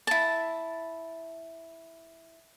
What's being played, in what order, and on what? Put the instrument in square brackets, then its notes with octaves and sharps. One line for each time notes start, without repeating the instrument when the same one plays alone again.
[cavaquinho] E4 A5